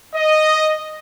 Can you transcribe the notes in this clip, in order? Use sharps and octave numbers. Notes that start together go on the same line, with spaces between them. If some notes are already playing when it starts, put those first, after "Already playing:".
D#5